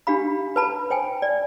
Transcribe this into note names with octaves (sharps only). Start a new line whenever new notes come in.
D4 G4 F5 B5
B4 A5 B5
C5 G5 G#5
D5